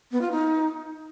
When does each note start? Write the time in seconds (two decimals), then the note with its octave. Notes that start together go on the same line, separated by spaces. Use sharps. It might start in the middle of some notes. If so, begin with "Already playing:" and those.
0.12 B3
0.21 F4
0.31 D#4